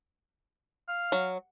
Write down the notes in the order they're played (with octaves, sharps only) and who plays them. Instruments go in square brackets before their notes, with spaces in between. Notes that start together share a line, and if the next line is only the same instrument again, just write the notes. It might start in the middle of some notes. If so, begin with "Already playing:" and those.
[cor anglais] F5
[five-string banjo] F#3